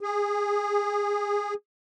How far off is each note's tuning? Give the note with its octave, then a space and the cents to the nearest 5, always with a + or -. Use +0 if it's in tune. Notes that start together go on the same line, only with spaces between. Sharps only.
G#4 -20